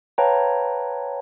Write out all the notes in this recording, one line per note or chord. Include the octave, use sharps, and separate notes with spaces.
B4 C#5 F5 G5 A5 A#5